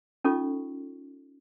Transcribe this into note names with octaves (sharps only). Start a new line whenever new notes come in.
C#4 D#4 F4 A4 C#6